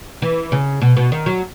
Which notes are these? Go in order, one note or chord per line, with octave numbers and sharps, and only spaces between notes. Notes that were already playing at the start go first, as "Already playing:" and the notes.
E3
C#3
B2
B2
D#3
F#3